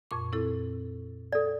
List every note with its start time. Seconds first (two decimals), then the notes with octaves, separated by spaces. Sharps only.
0.11 F2 A#2 C#6
0.32 C4 E4 A4
1.32 A4 D5